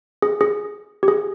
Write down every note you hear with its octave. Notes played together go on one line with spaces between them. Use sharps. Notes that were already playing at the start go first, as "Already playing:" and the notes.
G#4
G#4
G4
G#4